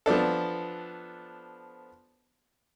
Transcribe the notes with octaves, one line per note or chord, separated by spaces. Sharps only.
F3 B3 D4 A4